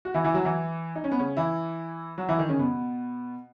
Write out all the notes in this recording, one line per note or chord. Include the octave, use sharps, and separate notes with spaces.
F#4
E3 E4
E3 E4
F#3 F#4
E3 E4
D#4
C#4
B3
C#3 C#4
E3 E4
F#3 F#4
E3 E4
D#3 D#4
C#3 C#4
B2 B3